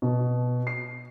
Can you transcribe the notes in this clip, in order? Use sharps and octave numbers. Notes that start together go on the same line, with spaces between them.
B2
C7